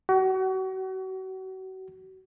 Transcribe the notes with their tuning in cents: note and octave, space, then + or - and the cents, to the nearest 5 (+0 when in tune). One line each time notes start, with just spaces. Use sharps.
F#4 +35